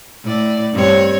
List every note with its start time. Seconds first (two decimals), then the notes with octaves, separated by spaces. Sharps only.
0.24 A2 D5
0.73 G2 C4 C#5